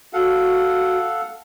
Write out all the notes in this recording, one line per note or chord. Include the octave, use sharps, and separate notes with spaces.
F#4 A4 F5 F#5